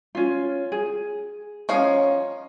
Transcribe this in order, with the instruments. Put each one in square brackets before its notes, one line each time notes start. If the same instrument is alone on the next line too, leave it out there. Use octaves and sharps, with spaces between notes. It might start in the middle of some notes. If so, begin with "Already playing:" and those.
[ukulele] C#4 F4
G#4
[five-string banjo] F3 D#4 F5 [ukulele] C#4 C#5